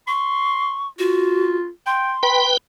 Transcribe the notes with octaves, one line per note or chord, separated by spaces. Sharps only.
C6 C#6
F4 F#4
G5 C6
B4 G5 B5